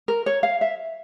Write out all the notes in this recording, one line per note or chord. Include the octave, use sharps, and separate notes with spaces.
A#4
C#5
F5
E5